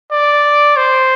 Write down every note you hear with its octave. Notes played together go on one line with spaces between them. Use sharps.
D5
C5